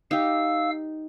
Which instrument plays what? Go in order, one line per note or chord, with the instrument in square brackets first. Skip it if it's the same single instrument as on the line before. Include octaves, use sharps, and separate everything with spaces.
[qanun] D#4 G4 [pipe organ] F5 E6